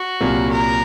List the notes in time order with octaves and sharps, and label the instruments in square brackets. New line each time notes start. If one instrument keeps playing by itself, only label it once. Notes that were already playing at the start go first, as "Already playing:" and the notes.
Already playing: [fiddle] F#4
[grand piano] C2 A#2 F#3 A#3 F4
[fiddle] A#4